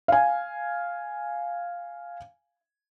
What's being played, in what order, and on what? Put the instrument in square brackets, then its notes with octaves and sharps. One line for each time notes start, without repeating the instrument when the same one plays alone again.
[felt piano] F5 G#5